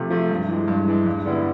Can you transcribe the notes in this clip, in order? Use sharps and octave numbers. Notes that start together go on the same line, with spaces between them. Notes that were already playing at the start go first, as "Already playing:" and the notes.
Already playing: C3 F3 A3
F3 A3
G2
E3 G#3
G2
E3 G#3
G2
D3 G3 B3 E4